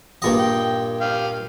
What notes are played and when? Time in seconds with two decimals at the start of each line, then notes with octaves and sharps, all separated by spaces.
0.22 G2 A#2 D#5
0.39 G5
1.01 G4 F5